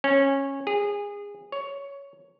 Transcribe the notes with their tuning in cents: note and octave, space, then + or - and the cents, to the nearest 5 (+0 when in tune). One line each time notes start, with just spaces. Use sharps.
C#4 -15
G#4 -25
C#5 +10